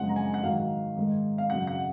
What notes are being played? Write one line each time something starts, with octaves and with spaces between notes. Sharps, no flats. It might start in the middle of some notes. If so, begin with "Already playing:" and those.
Already playing: F#2 C#3 F3 G#3 F#5
A#5
G#5
F#5
G#2 D#3 F#3 F5
G#2 D#3 G#3
F5
F#2 C#3 F#3 F#5
F#5